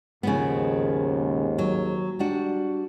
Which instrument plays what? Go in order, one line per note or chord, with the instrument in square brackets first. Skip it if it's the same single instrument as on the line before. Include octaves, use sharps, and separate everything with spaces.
[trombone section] D#2 G#2 [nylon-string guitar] C#3 F3 B3
[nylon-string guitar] F#3
G3 D4 F#4